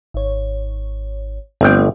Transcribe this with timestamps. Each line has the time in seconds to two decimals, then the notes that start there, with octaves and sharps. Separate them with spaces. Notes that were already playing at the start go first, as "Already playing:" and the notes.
0.14 G#1 C#5
1.61 G1 A3 C4 G5